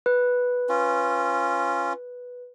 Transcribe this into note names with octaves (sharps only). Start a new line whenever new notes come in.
B4
C#4 F4